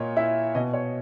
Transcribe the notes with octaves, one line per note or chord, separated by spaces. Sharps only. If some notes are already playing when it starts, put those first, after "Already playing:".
Already playing: A#2 A#4 C#5 D#5
E4 E5
B2 D#5
C#5